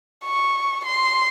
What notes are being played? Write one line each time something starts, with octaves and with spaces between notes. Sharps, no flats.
C#6
C6